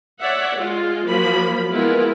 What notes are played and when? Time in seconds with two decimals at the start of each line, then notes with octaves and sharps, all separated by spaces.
0.21 C#5 D5 E5 F#5
0.56 G#3 F4
1.07 F3 F#3 A#3 B5
1.71 G#3 B3 E4 F4 A#4 B4